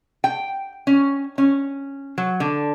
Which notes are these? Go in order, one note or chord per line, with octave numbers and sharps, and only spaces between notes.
G5
C#4
C#4
F#3
D3